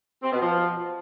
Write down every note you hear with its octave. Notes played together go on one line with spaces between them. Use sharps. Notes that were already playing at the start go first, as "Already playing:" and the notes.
C4
B2
F3